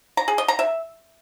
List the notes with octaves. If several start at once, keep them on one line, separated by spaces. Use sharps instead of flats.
A#5
G#4
D#5
A#5
E5